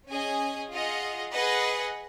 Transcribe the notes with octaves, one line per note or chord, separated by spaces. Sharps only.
C#4 G#4 D#5 G#5
F4 G#4 D#5 F#5
G#4 B4 D#5 F#5